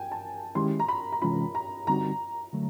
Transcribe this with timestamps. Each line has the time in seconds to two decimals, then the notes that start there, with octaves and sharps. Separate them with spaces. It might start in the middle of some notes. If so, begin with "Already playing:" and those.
Already playing: G5 G#5
0.12 A5
0.55 D#3 G#3 C#4 E4 G4 C6
0.80 A#5
0.89 B5
1.12 A#5
1.22 C3 E3 G#3 C#4 F4 B5
1.55 A#5
1.87 D3 G3 C4 D#4 F#4 A#5
2.53 D3 F#3 A3